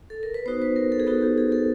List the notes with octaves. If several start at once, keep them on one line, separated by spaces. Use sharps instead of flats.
A4
A#4
B4
B3 D#4 F#4 C5
B4
A#4
A4
G#4
B3 D#4 F#4 A4
G4
G#4
A4